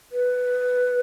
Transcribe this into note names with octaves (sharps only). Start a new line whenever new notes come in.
B4